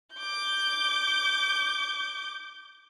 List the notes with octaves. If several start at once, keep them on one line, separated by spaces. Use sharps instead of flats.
D6 G6